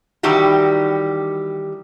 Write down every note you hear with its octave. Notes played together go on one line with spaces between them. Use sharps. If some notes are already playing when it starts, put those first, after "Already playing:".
D#3 E3 G3 F#4 G4